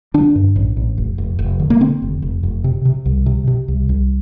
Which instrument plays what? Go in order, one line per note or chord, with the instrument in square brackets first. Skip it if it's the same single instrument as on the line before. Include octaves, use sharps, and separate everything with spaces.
[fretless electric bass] D3 D4
G2
A1
A1
F1
F1
F1
D3
A#3
D3 C4
F1
F1
F1
C3
C3
C2
C3
C3
C2
C2